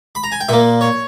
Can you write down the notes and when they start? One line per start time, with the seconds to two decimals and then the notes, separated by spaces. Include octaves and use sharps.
0.15 B5
0.23 A#5
0.32 G#5
0.40 G5
0.49 A#2 A#3 E5
0.81 C#5